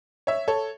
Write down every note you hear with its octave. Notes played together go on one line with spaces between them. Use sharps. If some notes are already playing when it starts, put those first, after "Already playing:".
C#5 E5
A4 C#5